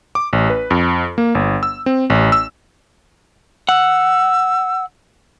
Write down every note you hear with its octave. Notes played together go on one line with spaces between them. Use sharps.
D6
A1
B4
F2
A#3
G1
E6
C4
A1
E6
F#5 E6